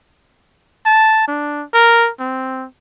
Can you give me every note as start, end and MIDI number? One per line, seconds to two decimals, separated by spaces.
0.86 1.27 81
1.28 1.64 62
1.74 2.10 70
2.20 2.66 60